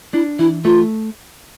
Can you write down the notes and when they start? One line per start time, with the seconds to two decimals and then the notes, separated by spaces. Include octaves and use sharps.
0.13 D4 E4
0.39 E3 E4
0.64 A3 F4